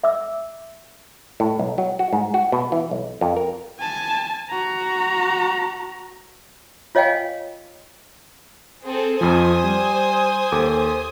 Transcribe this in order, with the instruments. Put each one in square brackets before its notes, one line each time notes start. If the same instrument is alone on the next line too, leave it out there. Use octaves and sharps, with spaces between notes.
[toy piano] E5 D6 E6
[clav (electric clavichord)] A2
B1
F#3
F#4
G#2
F#4
B2
E3
B1
F2
A#4
[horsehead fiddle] G#5 A5
F#4 A#5
[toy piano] F4 C#5 D#5 F5 G5 G#5
[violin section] C4 G#4 A4
[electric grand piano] F2 F3 [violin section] C5 G#5 D#6
[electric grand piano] G3
D#2 A4 D6